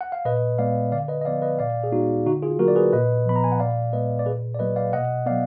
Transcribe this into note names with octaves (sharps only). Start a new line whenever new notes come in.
F#5
F5
A#2 B4 D#5
G#3 B3 D5 F5
D3 D5 F5
B4 D#5
D#5
F3 B3 D5 F5
B4 D#5
A#2 D5 F5
G#4
G#3 B3 D#4 F#4
D3 D#4 F#4
F4 G#4
F#3 A#3 F#4 A#4
D5
G#4 B4
A#2 B4 D#5
F3 B3 B5
A#5
G#5
F#5
A#2 D5 F5
G#3 B3 B4 D#5
D5
A#2 G#4 B4
D5
F#3 A#3 B4 D#5
D5 F5
B2 D#5 F#5
F#3 B3 D5 F5